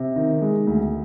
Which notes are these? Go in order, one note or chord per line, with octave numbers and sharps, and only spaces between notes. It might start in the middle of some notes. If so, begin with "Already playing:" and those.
Already playing: C3
D#3
G#3
D2